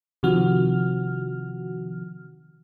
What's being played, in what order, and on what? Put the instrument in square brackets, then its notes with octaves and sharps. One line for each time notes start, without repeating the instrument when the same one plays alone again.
[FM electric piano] C3 D#3 F3 F#4 F6